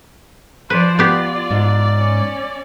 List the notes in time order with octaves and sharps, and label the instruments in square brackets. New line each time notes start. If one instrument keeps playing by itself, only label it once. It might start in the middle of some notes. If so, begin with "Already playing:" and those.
[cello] F3 D5 [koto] B4 [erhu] C5
[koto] B3 G4 [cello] F4 [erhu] D5
[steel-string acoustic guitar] G#2
[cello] C#4